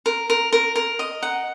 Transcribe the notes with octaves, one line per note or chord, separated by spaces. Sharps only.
A#4
A#4
A#4
A#4
D#5
F#5